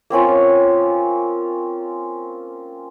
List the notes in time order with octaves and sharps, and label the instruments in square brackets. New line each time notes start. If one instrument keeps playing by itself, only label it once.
[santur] A#3 C4 C#4 F4